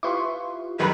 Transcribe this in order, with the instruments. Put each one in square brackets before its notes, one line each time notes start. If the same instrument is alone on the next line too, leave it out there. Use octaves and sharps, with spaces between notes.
[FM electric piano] E4 F4 G4 [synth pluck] B4 C6 C#6
[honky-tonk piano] F#2 D#3 G3 [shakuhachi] B4